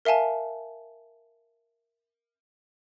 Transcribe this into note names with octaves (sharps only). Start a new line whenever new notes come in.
A#4 E5 F5 G#5 A5